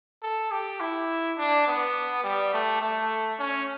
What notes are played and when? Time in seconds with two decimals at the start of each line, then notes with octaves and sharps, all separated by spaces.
0.23 A4
0.51 G4
0.80 E4
1.38 D4
1.67 B3
2.24 G3
2.53 A3
2.82 A3
3.39 C#4